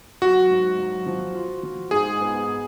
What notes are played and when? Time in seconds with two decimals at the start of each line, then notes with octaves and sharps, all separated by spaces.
0.22 F#3 F#4
0.50 G#2
0.78 F#3
1.06 F3
1.35 F4
1.63 F3
1.91 G#2 G#4
2.20 B3